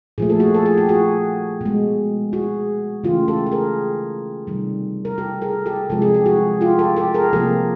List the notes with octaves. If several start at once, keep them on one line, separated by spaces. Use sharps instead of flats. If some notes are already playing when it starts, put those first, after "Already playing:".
A#2 F3 A3 G#4
A4
F#4 G#4
A4
G#4
G4
F#4 G#4
B2 G#3
F#4 G#4
C#3 E3 A3 F4 G4
G4 A4
A4
G#4 A#4
C3 D#3 G3
A#4
G4 A4
G#4 A#4
G4 A4
C3 F3 G#3 A4
G#4
G4
F#4 G#4
F4 G4
G4 A4
G4 A4
G#4 A#4
C3 F3 A#3 G4 A4